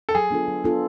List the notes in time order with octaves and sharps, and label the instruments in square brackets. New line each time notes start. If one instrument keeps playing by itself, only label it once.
[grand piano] A4
[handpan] F#3 [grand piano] G#4
[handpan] B3 D4 F4 A4
F#3
B3 D4 F4 A4